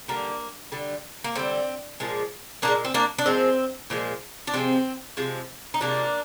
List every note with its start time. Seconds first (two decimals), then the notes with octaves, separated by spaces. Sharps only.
0.08 D3 G3 A#3
0.72 D3 G3
1.24 A#3
1.35 D3 G3 C4
2.00 A#2 F3 G#3
2.62 A#2 F3 A#3 D4
2.67 G#3
2.85 C4
2.94 A#3 D4
3.18 D4
3.26 A#2 F3 G#3 C4
3.90 A#2 F3 G#3
4.47 D4
4.54 C3 F3 G#3 C4
5.17 C3 F3 G#3
5.74 D#4
5.81 C3 F3 G#3 A#3 D4